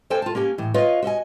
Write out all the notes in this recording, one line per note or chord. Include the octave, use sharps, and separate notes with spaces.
A#3 A4 C5 G5 G#5
F4 A5
A#3 C#4 G4 G#5
A2 E3
F4 B4 C#5 D#5 F5
F#4 D#5 E5 G#5